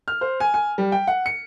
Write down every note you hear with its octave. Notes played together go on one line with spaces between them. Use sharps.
F6
C5
G#5
G#5
G3
G5
F#5
C#7